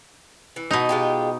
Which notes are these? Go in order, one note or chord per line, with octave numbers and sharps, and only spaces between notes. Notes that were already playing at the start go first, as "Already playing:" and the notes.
E3
B2 D#4
G#3 F4 G4